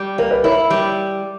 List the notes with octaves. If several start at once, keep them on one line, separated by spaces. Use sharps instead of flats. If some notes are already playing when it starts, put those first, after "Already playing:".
Already playing: G3
A#3 A#4
B4
E4 A#4 C#5
G3